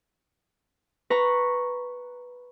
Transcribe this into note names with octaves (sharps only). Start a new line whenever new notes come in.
B4 A#5 C#6